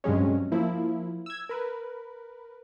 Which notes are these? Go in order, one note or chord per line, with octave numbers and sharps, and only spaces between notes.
G2 C3 F#3 G#3 C#4
F3 A#3 E4
E6 G#6
A#4 B4